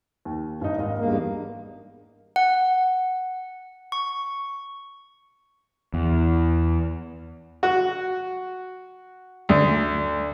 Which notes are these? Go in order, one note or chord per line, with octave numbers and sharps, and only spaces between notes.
D#2
G2 D#4
G#1 D#5 F5
E2 G2 A#3
F#5
C#6
E2
F#4
D2